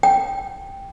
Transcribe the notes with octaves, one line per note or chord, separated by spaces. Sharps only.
G5